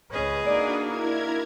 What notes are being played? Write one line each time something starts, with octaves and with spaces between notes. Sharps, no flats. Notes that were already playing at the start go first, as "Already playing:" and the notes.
C#2 C#4 G#4 B4 D#5
A#3 D4 D#4 F#4 D5
E4 A#4 G#6